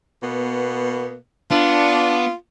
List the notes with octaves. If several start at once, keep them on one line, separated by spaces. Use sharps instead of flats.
B2 A#3 B3
B3 D4 F4